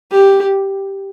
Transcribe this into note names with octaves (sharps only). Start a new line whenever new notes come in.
G4